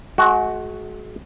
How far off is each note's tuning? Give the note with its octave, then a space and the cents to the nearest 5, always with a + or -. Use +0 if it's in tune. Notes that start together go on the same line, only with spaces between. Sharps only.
G#3 +40 F#4 +0 G5 -40